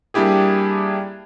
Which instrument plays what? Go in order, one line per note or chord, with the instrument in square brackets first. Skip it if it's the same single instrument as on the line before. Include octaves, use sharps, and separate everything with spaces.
[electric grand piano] G3 A#3 D4 E4 G4 G#4